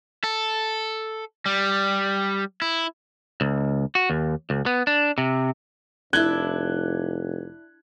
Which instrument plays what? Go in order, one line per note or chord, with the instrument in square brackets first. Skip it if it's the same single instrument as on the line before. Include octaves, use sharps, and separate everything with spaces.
[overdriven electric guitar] A4
G3
E4
[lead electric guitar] C#2
F#4
D#2
C#2
B3
D4
C3
[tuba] F1 [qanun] D4 E4 E5 [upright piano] F#6 G#6 G7